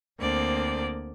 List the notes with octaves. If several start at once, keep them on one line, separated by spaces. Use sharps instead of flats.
D2 A#3 C4 D5